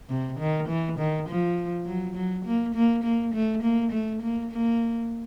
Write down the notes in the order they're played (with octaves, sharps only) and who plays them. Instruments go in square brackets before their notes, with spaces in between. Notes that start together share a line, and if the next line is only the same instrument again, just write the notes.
[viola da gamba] C3
D#3
E3
D#3
F3
F#3
F#3
A#3
A#3
A#3
A3
A#3
A3
A#3
A#3